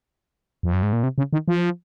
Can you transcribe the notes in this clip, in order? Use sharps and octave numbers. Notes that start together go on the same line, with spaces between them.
F2
F#2
G#2
A#2
C3
C#3
D#3
F3